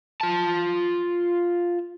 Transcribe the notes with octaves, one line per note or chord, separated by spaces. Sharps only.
F4 A5